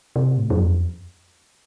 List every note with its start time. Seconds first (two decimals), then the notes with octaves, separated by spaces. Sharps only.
0.16 C3
0.38 A2
0.50 F#2
0.59 F2